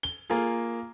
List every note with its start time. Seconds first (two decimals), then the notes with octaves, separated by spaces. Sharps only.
0.03 G7
0.30 A#3 F4 G#4